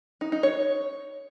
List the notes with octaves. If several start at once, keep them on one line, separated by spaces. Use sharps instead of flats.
D#4
D#4
C#5